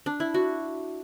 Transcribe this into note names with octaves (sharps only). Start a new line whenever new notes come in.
D4
E4
F#4